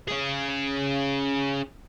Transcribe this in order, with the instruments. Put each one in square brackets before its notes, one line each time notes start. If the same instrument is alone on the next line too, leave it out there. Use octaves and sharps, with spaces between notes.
[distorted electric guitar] C#4 G#4